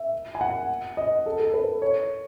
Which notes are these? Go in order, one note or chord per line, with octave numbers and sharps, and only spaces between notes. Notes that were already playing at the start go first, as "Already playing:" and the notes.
Already playing: E5
G#5
F#5
D#5
A4
A4
B4
C#5